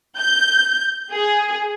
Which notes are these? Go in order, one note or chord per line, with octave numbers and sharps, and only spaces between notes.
G6
G#4